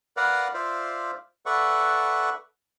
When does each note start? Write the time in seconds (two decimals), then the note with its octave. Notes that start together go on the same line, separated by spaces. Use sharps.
0.17 A#4 B4 D5 F5 F#5 A#5
0.54 F4 C5 D5 E5 F5
1.46 A4 B4 D5 E5 F#5 C#6